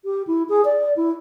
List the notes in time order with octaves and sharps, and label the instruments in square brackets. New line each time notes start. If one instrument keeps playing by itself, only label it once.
[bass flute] G4
E4
G#4
D5
E4